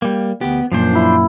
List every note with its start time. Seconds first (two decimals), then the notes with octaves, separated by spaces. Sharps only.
0.02 G3 A#3
0.41 D2 B3 G4
0.72 F#2 A#2 F3 D4 C5
0.93 E4 F#4